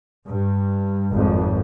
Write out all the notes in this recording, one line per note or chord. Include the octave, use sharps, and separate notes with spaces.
G2
G#1 F2